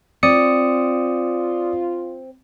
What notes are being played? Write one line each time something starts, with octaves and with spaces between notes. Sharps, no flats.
C4 F4 D5 D#6 C#7